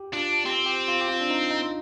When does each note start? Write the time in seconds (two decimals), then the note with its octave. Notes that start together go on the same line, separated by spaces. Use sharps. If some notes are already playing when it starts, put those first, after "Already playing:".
Already playing: G4
0.13 D4 F4
0.46 C4 G4
0.66 G4
0.88 F4
1.01 G4
1.08 F4
1.21 D4
1.30 D#4
1.51 D#4